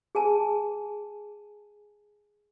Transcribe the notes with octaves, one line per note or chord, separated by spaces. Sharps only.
G#4 G#5 A5